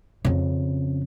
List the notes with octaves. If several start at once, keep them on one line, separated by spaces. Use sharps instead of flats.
F2 C#3